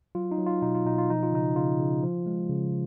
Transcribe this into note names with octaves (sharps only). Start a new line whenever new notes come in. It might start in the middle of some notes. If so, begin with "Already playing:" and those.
F#3 F4
D#4
F#3
F4
B2 D#4
F4
B2 D#4
F4
F3 D#4
F4
C#3 D#4
C#3 F4
C#3
F3
G#3
C#3